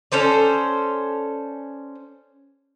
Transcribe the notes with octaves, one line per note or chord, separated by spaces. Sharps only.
C#4 A4 C5 D5